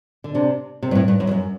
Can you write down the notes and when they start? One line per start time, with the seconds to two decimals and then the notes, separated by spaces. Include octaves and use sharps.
0.24 D3
0.34 C3 D4
0.83 C3 C4
0.91 G2
0.95 A2
1.08 G2
1.20 F#2
1.27 E2
1.31 F#2